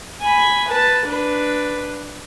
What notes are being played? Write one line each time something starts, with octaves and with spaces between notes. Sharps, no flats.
G#5 B5
B4 A5
D4 B4